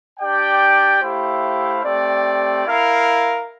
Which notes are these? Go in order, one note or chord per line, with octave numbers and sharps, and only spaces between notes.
D4 G4 D5 G5
A3 E4 G4 C5 F5
A3 C4 G4 D5
E4 A#4 F5